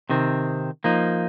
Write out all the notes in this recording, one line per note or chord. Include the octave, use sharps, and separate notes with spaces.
C3 D#3 C4
F3 A#3 D#4